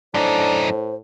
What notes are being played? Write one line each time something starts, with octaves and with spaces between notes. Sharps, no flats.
F#2 A2 D4 D#4 C5